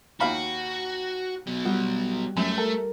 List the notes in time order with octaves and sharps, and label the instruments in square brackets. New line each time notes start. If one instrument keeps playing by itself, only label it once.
[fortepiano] D#2 F5 B5 [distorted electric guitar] F#4
[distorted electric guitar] B2 F#3
[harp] G3 G4 [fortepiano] F#4
[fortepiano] F#2 [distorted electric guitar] A3
[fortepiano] A4 [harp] A#4